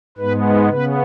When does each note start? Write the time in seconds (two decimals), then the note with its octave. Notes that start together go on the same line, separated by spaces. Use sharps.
0.18 G#2 G#3 B3 B4
0.69 C#3 B3 B4